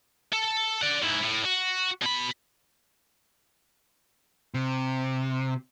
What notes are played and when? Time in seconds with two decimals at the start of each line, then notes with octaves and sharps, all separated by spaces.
0.33 A4
0.82 D5 F#5
1.02 G#2 E4
1.24 A2
1.45 F#4
2.02 B2 B5
4.54 C3